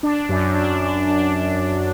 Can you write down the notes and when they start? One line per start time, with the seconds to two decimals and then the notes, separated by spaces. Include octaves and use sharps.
0.03 D4
0.29 F#2
0.55 D4
0.81 D4
1.07 D4
1.33 D4
1.59 D4